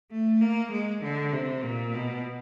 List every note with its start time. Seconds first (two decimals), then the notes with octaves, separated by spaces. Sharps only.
0.11 A3
0.41 A#3
0.71 G#3
1.03 D3
1.33 C3
1.63 A#2
1.94 B2